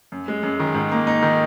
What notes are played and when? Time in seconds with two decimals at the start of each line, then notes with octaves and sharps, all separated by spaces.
0.12 F#2
0.28 G#3
0.43 F#2
0.60 D#3
0.75 G#2
0.92 A#3
1.07 D#4
1.22 D#3